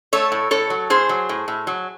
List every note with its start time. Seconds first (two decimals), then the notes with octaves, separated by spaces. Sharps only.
0.13 A3 A4 C#5
0.32 A2
0.51 A2 A4 C#5
0.70 F#3
0.90 A2 G#4 C5
1.09 F#3
1.29 A2
1.48 A2
1.67 F#3